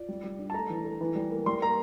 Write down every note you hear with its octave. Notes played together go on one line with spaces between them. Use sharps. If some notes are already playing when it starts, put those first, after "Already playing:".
Already playing: F4 D5
G3
G3
D4
A5
A3 A#5
E3
A3
E3
G3
A#3
G3 C6
A#3 A#5